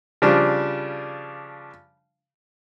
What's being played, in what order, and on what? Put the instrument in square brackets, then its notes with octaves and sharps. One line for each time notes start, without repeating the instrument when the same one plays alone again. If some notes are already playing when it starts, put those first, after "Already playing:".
[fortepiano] C#3 F3 G3 D4